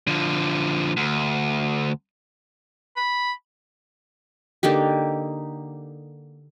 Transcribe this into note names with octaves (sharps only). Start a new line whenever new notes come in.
D3 F3
D2
B5
D3 A#3 D#4 G4